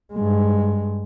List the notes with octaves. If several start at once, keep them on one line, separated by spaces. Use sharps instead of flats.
G2 G#3